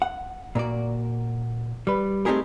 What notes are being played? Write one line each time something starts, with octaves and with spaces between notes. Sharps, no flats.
F#5
A#2 A#3 F#4 D5
G3 B4
A3 C4 D#4 G4 G#4 A#4